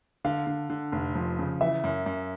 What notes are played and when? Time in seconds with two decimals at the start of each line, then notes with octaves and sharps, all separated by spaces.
0.24 D3 F5
0.47 D3
0.70 D3
0.92 F1
1.15 F3
1.39 C#3
1.61 E3 E5
1.84 F#2
2.06 F#2